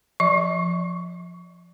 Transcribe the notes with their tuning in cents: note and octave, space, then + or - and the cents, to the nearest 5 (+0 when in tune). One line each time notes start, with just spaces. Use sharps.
F3 +0 D#5 +40 C#6 -35